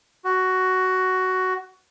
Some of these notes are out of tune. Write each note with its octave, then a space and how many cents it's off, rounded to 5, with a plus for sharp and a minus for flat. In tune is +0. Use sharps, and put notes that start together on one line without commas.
F#4 +10